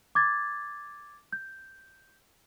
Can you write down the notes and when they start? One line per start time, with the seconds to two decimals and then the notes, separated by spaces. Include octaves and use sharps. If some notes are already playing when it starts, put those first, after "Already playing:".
0.15 D6 G#6 A6
1.33 G6